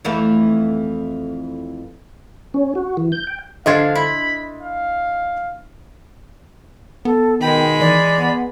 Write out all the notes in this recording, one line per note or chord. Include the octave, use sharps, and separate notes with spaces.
F2 E3 A3
C#4
F#4
E3
G6
G5
D3 F3 D4 D#5 F5 C6 G#6
E4 B5
F5
B3 A4
B2 D#3 G#3 G5 B5
E3 D5
B3